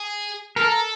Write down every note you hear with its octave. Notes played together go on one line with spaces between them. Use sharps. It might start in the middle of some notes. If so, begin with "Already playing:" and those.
Already playing: G#4
A4 A#4